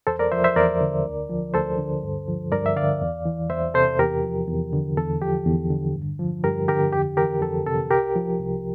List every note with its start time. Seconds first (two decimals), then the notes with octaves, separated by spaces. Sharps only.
0.07 E2 A4 C5
0.19 A#4 D5
0.31 F3 C5 E5
0.44 C5 E5
0.56 E2 A#4 D5
0.81 D3
1.05 D2
1.30 F3
1.54 D2 A4 C5
1.78 D3
2.03 G2
2.28 F3
2.52 G2 A#4 D5
2.66 E5
2.76 D3 D5 F5
3.01 E2
3.25 E3
3.50 E2 C5 E5
3.74 C3 A4 C5
3.99 E2 G4 A#4
4.23 F3
4.48 E2
4.73 D3
4.97 E2 A4
5.21 F3 G4
5.46 E2
5.70 D3
5.95 G2
6.19 F3
6.44 G2 G4 A#4
6.68 D3 G4 A#4
6.93 F2 G4
7.17 E3 G4 A#4
7.42 F2 A4
7.66 C3 A4
7.90 C2 G4 A#4
8.15 F3
8.40 C2